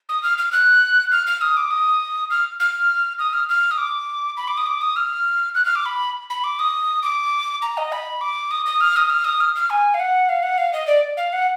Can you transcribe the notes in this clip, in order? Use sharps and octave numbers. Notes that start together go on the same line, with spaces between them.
D#6
F6
F6
F#6
F6
F6
D#6
D6
D#6
F6
F6
D#6
F6
F6
D#6
D6
B5
D6
D#6
D6
D#6
F6
F#6
F6
D6
B5
B5
D6
D#6
D6
A#5
D#5
B5
D6
D#6
D#6
F6
D#6
F6
D#6
F6
F6
G#5
F5
F#5
F5
F#5
F5
D#5
D5
F5
F#5